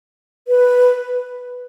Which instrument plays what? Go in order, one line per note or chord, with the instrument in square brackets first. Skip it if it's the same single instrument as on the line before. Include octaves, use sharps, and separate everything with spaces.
[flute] B4